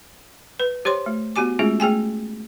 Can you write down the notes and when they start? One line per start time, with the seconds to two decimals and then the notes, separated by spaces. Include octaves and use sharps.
0.60 B4
0.85 G4 C5 C#5 C6
1.06 A3
1.36 B3 F#4 G4 G#5 D6
1.59 G#3 A3 C#4 F4 G#4
1.80 A3 G#4 G5 G#5